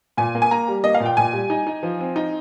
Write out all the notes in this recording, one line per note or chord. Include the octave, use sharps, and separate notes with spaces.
A#2 G#5
A#3
G#5
A#3 A#5
G3
A#3 D#5
F5
A#2
G5
A#2 G#5
G3
D#4
D#4
F3
C4
D#4